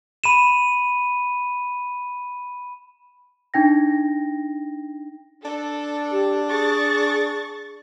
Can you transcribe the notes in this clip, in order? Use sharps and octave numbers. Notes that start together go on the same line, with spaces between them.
B5 D#7 E7
D4 D#4 G5 A#6
D4 A4
G4
G#4 C#6 A6